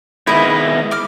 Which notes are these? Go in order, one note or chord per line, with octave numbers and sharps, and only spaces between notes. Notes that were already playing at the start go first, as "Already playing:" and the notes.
D#3 G#3 B3 E4 D#5
D6 F6